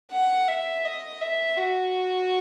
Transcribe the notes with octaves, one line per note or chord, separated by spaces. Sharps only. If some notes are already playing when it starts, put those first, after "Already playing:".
F#5
E5
D#5
E5
F#4